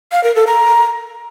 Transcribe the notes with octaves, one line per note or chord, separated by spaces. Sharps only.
F5
A#4
A4
A#5